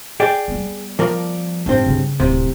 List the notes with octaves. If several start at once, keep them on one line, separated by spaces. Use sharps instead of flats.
G#4 D5 G5
G3 B3
F3 A#4 D5
A1 G2 C4 D#4
C#3 C#4
D1 C3